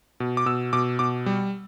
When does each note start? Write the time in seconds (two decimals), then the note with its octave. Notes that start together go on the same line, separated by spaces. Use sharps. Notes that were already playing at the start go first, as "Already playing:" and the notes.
0.20 B2
0.37 D6
0.46 B2 E6
0.73 B2 D6
0.99 B2 D6
1.26 G3